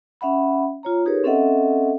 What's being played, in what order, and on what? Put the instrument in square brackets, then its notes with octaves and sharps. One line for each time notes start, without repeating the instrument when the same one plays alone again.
[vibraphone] C#4 E5 F#5 B5
F4 C#5 A#5
D#4 G4 G#4 A#4 B4 C#5
C4 C#4 A4 D#5 E5 F#5